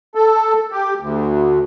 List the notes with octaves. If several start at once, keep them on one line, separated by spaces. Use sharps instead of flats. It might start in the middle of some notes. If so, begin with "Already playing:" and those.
A4
G4
D2